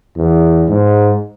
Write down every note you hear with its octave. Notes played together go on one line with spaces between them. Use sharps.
E2
G#2